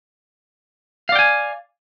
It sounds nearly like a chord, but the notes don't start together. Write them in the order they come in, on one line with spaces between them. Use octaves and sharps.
F5 D5 G5 G#5